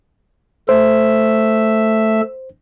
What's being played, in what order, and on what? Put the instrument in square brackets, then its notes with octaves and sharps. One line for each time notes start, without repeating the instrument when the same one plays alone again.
[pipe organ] A3 E5 [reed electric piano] C5